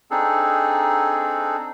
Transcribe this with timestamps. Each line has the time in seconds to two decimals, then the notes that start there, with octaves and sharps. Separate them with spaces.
0.11 C4 D4 D#4 G#4 A4